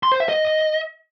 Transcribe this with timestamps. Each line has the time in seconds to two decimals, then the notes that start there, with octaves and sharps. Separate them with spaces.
0.03 C6
0.12 C5
0.20 E5
0.29 D#5